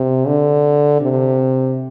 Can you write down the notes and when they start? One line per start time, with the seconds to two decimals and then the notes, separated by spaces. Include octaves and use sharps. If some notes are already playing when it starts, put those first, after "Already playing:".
Already playing: C3
0.27 D3
1.01 C3